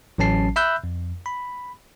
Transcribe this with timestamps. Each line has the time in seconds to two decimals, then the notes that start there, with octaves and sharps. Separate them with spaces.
0.18 A1 F#3 C#4 A5 C7
0.56 E5 B5 E6 F#6 G6
0.84 F2
1.26 B5